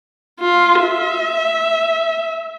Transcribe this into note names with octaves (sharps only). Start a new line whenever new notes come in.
F4
E5